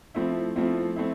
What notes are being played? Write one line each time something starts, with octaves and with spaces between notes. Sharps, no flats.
F3 A3 C4 E4
F3 A3 C4 E4
A3 C4 E4